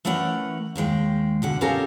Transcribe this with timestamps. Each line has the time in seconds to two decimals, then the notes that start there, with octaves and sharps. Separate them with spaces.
0.05 E3 A3 C#4 A#4 F#5 G5
0.76 D#2 D#3 G#3 G5
1.42 B2 D3 F#5
1.61 C#4 D#4 F4 G4 A4 A#4